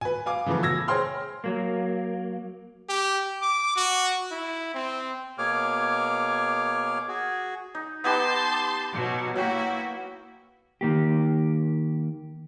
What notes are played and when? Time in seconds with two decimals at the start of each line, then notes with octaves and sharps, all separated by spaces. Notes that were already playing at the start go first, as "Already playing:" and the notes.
0.01 B4 G#5
0.26 F5 G#5 D6
0.46 C#3 E3 F3 A3 B3
0.63 E6 G#6 A#6
0.88 G#4 C5 C#5 G5 C6 F6
1.44 F#3 A#3
2.89 G4
3.42 D6
3.76 F#4
4.32 E4
4.74 C4
5.38 B2 A#3 G#4 C#5 D6 F6
7.08 F#4 G#4
7.75 D#4
8.04 B3 D#4 G4 A5 C6 G6
8.92 B2 F#3
9.36 F#3 A#3 E4 F#4 G5
10.81 D#3 A#3 G4